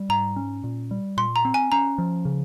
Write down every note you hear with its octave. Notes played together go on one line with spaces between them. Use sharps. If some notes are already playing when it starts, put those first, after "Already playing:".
Already playing: G3
G#2 A#5
C#4
A#2
G3
A#2 C6
A#5
C4
G#5
C#4 A#5
F3
C#3